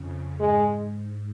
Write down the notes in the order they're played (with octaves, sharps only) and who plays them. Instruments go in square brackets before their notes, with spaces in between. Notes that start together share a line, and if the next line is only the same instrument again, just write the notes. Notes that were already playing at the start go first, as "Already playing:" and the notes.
Already playing: [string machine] F2 C#3
[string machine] G#2 [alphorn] G#3